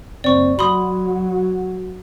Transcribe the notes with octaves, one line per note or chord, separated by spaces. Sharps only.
F#1 C4 D5 C#6
F#3 F#4 B5 C6 D#6